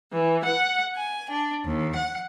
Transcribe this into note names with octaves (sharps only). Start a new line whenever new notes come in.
E3
F#5
G#5
D4
D#2
F#5